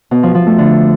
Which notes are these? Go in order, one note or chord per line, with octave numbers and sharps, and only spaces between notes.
B2
F3
F3
A3
D3